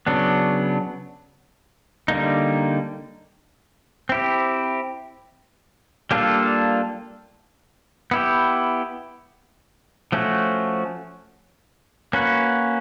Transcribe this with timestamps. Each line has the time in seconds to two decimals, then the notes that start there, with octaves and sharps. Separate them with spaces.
0.07 C#3 F#3 B3 D4
2.08 D3 G3 A#3 D#4
4.09 C4 E4 G4
6.11 G3 A#3 D4 F4 A4
8.11 B3 E4 G4
10.12 F3 A3 C#4 F#4
12.13 A#3 C#4 F#4 B4